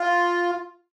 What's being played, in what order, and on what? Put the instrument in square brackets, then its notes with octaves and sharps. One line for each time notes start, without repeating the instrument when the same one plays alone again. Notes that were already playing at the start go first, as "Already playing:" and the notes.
Already playing: [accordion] F4